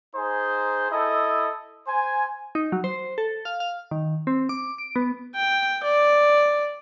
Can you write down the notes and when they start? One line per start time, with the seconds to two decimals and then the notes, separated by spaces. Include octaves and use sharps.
0.16 D#4 G#4 C5
0.91 E4 A4 D#5
1.88 C5 G#5
2.55 D#4
2.72 F#3
2.84 C5
3.18 A4
3.45 F5
3.60 F5
3.91 D#3
4.27 C4
4.49 D6
4.78 D7
4.96 B3
5.36 G5
5.84 D5